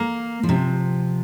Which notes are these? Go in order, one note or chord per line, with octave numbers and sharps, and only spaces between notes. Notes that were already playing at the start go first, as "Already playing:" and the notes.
Already playing: A#3
F3
C3